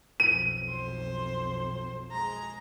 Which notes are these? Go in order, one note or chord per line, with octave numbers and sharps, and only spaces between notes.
B1 F2 D#7
C5
G#3 A#5